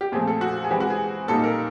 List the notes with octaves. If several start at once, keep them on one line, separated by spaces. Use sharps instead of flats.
G4
A#2 F3 A3 C4 G#4
A4
F#4
G#4
E3 G#3 C4 G4
F#4
G#4
A#2 G3 A#3 D#4 A4
A#4